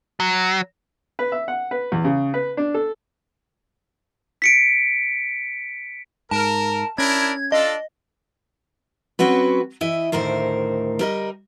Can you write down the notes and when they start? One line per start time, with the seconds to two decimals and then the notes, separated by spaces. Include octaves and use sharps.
0.20 F#3
1.19 B4
1.32 E5
1.48 F#5
1.71 B4
1.92 E2
2.04 C#3
2.34 B4
2.57 D4
2.74 A4
4.42 B6 C#7 D7
6.31 G#2 A#4 A5
6.98 C#4 D4 E4 A#4 G#6
7.52 D4 F4 A4 D#5
9.19 F#3 C4 C#4 F#4 B4
9.81 E3 E4 D#5
10.12 D2 A2 D#3 A#4 C5
10.99 G3 A#4 D#5